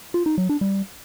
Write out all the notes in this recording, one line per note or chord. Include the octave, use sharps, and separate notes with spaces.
F4
D#4
F#3
D4
G3